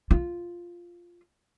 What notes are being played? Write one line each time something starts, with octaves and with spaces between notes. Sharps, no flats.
F4